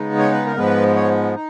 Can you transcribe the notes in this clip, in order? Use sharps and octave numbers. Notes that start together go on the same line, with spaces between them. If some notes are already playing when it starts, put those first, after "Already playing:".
Already playing: C#3 G#3 B3 D#4
C#5
B4
A#4
G#2 F3 G#3 B3 B4
C#5
D#4